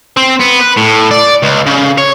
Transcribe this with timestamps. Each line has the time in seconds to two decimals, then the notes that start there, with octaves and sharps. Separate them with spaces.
0.17 C4
0.41 B3
0.61 B4
0.77 A2
1.11 D5
1.43 C#2
1.66 C#3
1.98 C#5